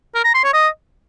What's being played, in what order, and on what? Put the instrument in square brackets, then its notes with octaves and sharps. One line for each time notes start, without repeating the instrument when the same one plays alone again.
[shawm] A#4
A#5
C6
C#5
D#5